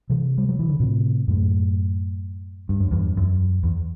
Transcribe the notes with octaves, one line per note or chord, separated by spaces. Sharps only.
C3 E3
G3
F#3
E3
D3
A2 C3
F#2 A2
G2
F#2
E2 G2
F#2
E2